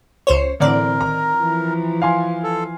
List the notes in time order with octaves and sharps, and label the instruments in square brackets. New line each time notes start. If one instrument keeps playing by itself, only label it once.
[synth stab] C#2 C5 C#5
[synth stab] A2 D3 D5 [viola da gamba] E3 C4 [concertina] A#4
[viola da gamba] D#3 [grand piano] A#5
[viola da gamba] E3 F3
[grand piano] F5 G#5 C6
[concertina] A4